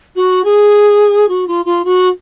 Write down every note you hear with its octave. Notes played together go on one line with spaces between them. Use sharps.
F#4
G#4
F#4
F4
F4
F#4